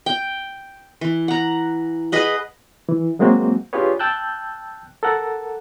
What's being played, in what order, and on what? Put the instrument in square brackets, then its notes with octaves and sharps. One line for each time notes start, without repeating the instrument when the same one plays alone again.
[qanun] G5
E3
F#5 A#5
G#4 B4 D#5 F#5
[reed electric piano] E3
F#3 G#3 A#3 C4 F#4
D4 F4 G4 G#4 B4 C#5
G5 A5 E6 F#6 G6
A4 A#4 F#5